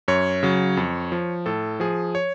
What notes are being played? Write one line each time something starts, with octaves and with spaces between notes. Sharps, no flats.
F#2 C#5
C#3 F#3
F2
F3
A2 A4
F3 G#4
C#5